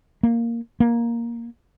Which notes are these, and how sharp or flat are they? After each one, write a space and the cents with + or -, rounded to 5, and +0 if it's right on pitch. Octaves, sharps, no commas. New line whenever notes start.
A#3 -5
A#3 +5